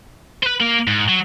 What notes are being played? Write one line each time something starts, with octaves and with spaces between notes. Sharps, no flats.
B4 C5
A#3
G#2
F#3